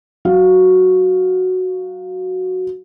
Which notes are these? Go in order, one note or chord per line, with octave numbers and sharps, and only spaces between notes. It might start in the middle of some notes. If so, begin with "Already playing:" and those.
F#3 F#4 F5